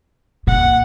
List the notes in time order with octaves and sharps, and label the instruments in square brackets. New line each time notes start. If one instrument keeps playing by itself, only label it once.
[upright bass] A#2 [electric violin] F#5